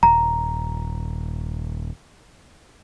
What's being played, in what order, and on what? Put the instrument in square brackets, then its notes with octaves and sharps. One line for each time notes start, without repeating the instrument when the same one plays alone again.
[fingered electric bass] D#1 [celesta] A#5